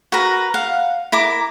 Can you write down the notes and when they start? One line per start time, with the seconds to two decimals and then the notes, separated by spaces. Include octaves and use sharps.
0.12 F#4 A#4 B4 A#5
0.54 F5 F#5
1.12 E4 A#4 D6